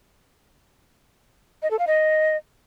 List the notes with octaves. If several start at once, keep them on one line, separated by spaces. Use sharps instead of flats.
D#5
A4
F5
D#5